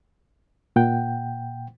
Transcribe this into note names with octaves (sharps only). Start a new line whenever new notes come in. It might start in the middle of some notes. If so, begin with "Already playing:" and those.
A#2 F#5 G5